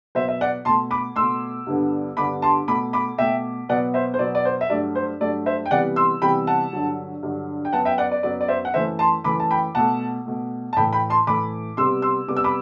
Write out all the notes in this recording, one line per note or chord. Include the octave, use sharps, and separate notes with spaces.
B2 F#3 B3 C5 E5
E5
D5 F#5
B2 A3 A5 C6
B5 D6
B2 A3 C6 E6
G2 D3 G3 B3
G2 D3 G3 B3 B5 D6
A5 C6
B2 A3 B5 D6
B5 D6
B2 A3 E5 G5
B2 F#3 B3 D5 F#5
C5 E5
C5
B2 F#3 B3 D5
D5
C5
E5
G2 F#3 A3 D5
C5
G2 F#3 A3 D5
C5 E5
G5
C3 E3 G3 B3 D5 F#5
C6 E6
C3 E3 G3 B3 G5 B5
F#5 A5
G2 D3 F#3
G2 D3 F#3
G5
F#2 F#3 B3 F#5 A5
E5 G5
D5 F#5
D5
F#2 F#3 B3 D5
D5
C5 E5
F#5
F#2 E3 A3 C5 E5
A5 C6
F#2 E3 A3 B5 D6
A5
G5 B5
B2 A3 F#5 A5
B2 A3
A5
A2 E3 A3 G5 B5
G5 B5
A5 C6
A2 E3 A3 B5 D6
C3 G3 B3 C6 E6
C6 E6
C3 G3 B3 D6
E6
B5 D6